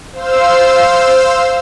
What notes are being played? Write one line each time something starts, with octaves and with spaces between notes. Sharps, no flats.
C5 F5 E6